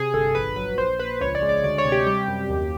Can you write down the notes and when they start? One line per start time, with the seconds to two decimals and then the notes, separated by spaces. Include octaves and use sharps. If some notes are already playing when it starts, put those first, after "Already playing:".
Already playing: C3 G#4
0.13 G1 A4
0.34 A#1 B4
0.56 F#3 B4
0.78 A#1 C5
0.99 A#1 B4
1.21 C#2 C#5
1.35 D5
1.42 G#3
1.49 D5
1.64 D2 D5
1.78 C#5
1.85 C3
1.92 G4
2.07 G3 G4
2.28 F#2
2.50 D#2